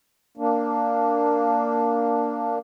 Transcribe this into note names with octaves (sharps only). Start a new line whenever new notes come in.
A#3 D4